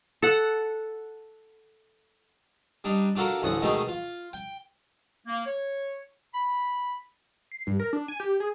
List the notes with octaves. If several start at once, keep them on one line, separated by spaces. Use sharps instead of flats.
A4 F#5
G3 D4 D#4
D4 F4 F#4 A4 A#4
A1 D2 A2 F#5 D#6
B2 D#3 G#3 A3 D#4
F4
G5
A#3
C#5
B5
C7
G2
A#4
D4
G#5
G4
G#4